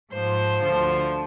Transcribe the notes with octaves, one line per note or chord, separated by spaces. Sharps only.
G#2 F3 C5
D2 D3 F3